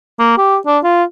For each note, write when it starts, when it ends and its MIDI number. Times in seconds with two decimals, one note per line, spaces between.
0.19 0.37 58
0.38 0.57 67
0.67 0.78 62
0.84 1.04 65